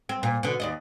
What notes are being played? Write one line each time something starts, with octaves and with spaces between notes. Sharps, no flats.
C4
A#2
B2 D3
D#2 D5 D#5